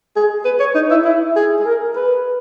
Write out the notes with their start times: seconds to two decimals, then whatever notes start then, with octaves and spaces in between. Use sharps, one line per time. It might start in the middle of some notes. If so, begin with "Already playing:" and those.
0.16 G#4
0.45 B4
0.60 C#5
0.75 D#4
0.91 E4
1.05 E4
1.36 G#4
1.59 G#4
1.66 A#4
1.96 B4